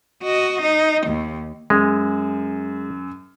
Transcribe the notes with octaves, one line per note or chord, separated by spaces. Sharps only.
F#4 D#5
D#4
D#2
F#2 G#3